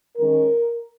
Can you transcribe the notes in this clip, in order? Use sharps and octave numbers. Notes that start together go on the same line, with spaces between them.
D#3 G#3 C#4 A#4